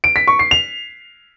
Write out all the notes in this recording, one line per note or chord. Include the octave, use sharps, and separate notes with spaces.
D7
B6
C#6
C7
F7